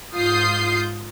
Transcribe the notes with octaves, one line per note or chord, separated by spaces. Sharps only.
G#2 F4 D#6 G6 C7